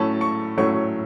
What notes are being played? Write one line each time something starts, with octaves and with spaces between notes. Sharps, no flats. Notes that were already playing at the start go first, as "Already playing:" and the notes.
Already playing: A2 F#3 A3 C#4 A5
C#6
A2 F#3 A3 C#4 C#6